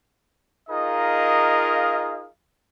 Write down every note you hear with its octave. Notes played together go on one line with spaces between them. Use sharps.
D#4 F4 G#4 A#4 D#5 F5